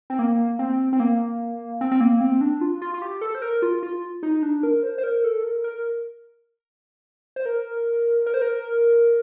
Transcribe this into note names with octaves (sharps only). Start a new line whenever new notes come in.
C4
A#3
C4
C4
A#3
C4
C4
A#3
C4
D4
F4
F4
F4
G4
A4
C5
A#4
F4
F4
D#4
D4
A#4
C5
C5
A#4
A4
A#4
A#4
C5
A#4
A#4
C5
A#4